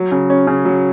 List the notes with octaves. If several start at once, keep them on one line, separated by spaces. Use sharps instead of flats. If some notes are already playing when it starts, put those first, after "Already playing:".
Already playing: F#3
C#3
C#4
C#3
F#3